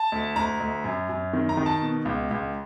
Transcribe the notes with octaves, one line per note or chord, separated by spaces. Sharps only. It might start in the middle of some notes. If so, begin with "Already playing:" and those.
Already playing: A5
D2
D2 A#5
D2
F#2
F#2
D#3
A#5
D#3
A5
B2
C#2
C#2